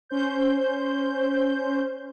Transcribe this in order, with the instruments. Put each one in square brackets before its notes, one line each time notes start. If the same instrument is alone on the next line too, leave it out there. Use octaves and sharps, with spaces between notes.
[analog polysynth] C#4 C5 G6